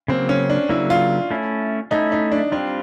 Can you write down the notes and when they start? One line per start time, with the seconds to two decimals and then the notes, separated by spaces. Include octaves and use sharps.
0.08 C#3 F#3 A#3 C4
0.29 C#4
0.50 D4
0.69 C#3 F#3 A#3 E4
0.90 F4
1.30 A3 C#4 E4
1.91 A3 C#4 D#4 E4
2.12 D#4
2.32 D4
2.52 G3 C4 D4 F4